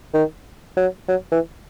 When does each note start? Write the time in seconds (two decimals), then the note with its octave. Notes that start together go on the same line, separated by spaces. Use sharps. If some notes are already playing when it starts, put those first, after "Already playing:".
0.14 D#3
0.77 F#3
1.08 F#3
1.32 E3